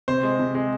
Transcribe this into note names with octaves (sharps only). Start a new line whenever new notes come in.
C3 C5
G#3
C3
G#3